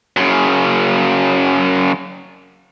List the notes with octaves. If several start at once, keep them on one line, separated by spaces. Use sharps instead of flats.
F#2 C#3